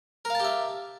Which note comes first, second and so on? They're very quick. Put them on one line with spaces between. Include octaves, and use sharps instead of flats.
A#4 F5 A5 G4 E5